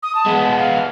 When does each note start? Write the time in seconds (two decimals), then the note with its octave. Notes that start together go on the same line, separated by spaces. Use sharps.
0.02 D#6
0.15 A5
0.26 G#3 B3
0.58 F5